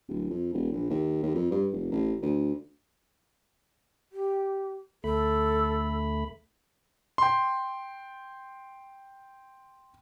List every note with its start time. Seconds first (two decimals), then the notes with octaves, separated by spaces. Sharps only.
0.08 D1
0.30 F2
0.53 E1
0.72 A#1
0.90 D#2
1.22 D#2
1.34 F2
1.51 G2
1.72 F1
1.91 A1
2.22 D2
4.12 G4
5.04 D2 A3 A4 B5
7.18 G5 C6